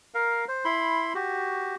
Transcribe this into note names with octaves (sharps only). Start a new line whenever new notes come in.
A#4 F5
C5
E4 B5 C6
F#4 G4